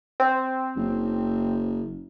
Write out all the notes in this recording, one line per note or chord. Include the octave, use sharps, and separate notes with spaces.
C4
F#1